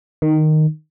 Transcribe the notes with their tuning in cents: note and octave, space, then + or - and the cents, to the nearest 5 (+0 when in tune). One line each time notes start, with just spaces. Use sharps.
D#3 -10